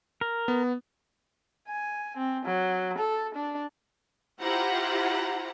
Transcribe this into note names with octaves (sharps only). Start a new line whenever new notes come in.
A#4
B3
G#5
C4
F#3
A4
D4
E4 F4 G4 C5 F#5 A#5